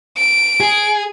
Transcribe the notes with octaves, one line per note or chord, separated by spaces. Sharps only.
D7
G#4